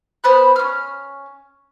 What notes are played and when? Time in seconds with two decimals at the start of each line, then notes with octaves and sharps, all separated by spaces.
0.24 B3 C5 B5 F#6
0.56 C#4 F6